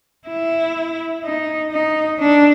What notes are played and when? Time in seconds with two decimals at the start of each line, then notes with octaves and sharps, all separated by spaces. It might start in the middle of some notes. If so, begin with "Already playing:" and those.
0.28 E4
1.24 D#4
1.72 D#4
2.20 D4